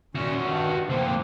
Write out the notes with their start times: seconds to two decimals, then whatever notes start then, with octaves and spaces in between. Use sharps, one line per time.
0.15 A#2 D#3 C#4 F#4 E5
0.45 G2 D#3
0.90 D3 F3 A#3 C4